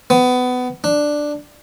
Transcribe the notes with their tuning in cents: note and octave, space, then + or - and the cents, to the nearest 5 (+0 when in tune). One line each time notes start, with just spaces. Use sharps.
B3 +20
D4 +5